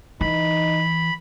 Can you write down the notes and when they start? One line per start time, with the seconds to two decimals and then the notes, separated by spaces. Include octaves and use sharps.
0.21 E3 D#4 B5